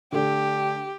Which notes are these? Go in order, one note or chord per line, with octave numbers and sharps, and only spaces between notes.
D3 A3 D4 G4